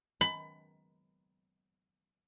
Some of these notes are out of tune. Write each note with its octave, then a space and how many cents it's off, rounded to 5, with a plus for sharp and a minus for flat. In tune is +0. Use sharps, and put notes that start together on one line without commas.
B5 +25